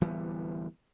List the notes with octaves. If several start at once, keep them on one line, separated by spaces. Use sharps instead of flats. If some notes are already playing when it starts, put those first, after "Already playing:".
D1 E3 G3 B3